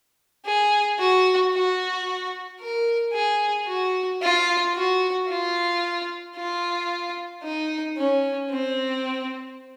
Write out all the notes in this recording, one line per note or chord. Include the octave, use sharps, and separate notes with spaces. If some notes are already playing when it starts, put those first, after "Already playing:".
G#4
F#4
F#4
A#4
G#4
F#4
F4
F#4
F4
F4
D#4
C#4
C4